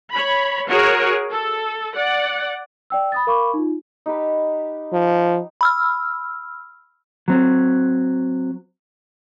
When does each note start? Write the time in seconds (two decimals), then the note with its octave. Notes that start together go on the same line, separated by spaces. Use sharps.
0.12 C#5 B5
0.68 F#4 G#4 A#4 C#5
1.31 A4
1.95 D5 F#5
2.90 D5 G5 E6
3.12 B5 D#6 A6
3.27 A#4 F5 B5 C#6 D6
3.54 D#4 F4
4.06 D#4 G4 B4
4.93 F3
5.61 B5 E6 F6
7.28 F#3 C4